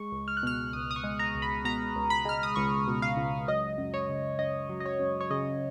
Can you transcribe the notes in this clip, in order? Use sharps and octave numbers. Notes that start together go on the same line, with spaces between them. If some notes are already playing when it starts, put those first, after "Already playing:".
Already playing: G#3 C#6
C#2
F6
F#6
B2 F6
C#2 D#6
D#6
C#6
G#3
A#5
C#2
B5
B2 A#5
C#2
B5
G#3 F6
D#6
C#2 C#6
B2
F5
C#2
F#3 D#5
F#2
C#5
C#3
F#2 D#5
F#3
D#5
C#5
F#2
C#5
C#3 D#5